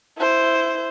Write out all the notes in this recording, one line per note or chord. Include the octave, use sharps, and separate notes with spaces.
E4 C5